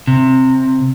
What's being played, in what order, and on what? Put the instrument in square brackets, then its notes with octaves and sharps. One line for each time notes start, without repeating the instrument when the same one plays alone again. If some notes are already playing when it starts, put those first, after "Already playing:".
[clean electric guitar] C3